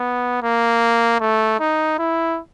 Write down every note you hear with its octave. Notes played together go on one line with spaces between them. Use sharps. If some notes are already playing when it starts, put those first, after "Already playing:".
Already playing: B3
A#3
A3
D#4
E4